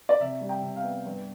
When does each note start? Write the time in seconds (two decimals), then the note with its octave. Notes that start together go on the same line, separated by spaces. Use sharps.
0.09 D5
0.20 C3 E5
0.41 G3
0.49 G5
0.62 C3
0.76 F5
0.83 B3
1.05 G2